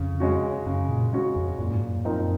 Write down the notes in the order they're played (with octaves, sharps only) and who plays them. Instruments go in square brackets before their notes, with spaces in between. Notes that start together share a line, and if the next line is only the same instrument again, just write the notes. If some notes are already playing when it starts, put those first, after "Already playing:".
Already playing: [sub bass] F2 [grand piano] C#3
[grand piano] G#3 C#4 F#4
[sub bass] F#2 [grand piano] C#3
[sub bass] A#2
[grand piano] G#3 C#4 F#4
[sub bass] F2
[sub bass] F#2 [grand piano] A#2
[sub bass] G#2
F#2
[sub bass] F#2 [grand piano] F3 C4 D#4 A#4